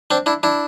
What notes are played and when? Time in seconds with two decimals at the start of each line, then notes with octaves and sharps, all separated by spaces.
0.11 C4 D4
0.26 D4 E4
0.43 D4 E4